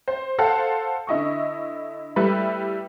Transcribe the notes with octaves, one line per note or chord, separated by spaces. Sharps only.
C5
A4 C5 F5 F#5 A5
D3 E4 D#5 C#6
G3 A3 E4 B4